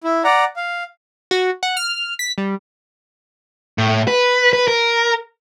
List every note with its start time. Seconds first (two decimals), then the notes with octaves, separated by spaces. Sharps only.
0.04 E4
0.24 D5 F#5 A#5
0.56 F5
1.31 F#4
1.63 F#5
1.77 F6
2.19 B6
2.38 G3
3.78 A2
4.08 B4
4.53 B4
4.68 A#4